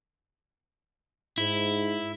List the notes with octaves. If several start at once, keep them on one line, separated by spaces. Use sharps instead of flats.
G#2 E4